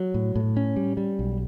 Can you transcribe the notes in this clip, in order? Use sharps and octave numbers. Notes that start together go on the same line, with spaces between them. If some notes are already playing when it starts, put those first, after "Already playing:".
Already playing: F#3
A2
A2
C#4
G3
G3
B1